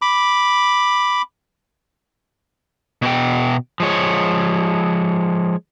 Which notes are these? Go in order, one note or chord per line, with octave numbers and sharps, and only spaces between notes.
B5 D6
B2 F#4 B4 G5
F3 G#3 C#5